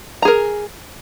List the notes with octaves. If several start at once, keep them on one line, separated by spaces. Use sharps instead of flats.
G#4 A#4 A#5